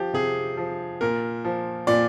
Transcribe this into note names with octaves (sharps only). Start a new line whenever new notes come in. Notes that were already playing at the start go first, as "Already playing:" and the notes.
Already playing: F3 G4
C3 G#4
F3
A#2 A#4
F3
A#2 D5